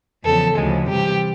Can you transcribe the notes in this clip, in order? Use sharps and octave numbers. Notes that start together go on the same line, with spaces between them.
E2 C#3 F3 A4
D2 C#3 F3 G#3
C3 E3 G3 G4